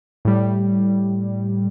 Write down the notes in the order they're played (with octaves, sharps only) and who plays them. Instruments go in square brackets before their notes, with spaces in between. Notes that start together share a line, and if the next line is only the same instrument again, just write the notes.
[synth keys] A2 G3